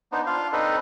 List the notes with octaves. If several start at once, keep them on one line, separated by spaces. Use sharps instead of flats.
B3 D4 D#4 C5
D4 F4 F5
C4 D4 D#4 A4 B4 D#5